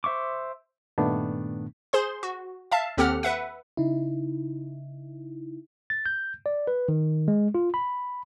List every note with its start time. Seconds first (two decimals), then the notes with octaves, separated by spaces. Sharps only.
0.04 C5 E5 C#6 D6
0.98 G2 A#2 D#3 A3 B3 D4
1.93 G#4 C5 C6
2.23 F#4
2.71 E5 F5 A5
2.97 D#2 C4 G4 A4 F#5 F6
3.23 B4 E5 F#5
3.77 C#3 D#4 E4
5.90 A6
6.06 G6
6.46 D5
6.67 B4
6.89 D#3
7.28 G#3
7.55 F4
7.74 B5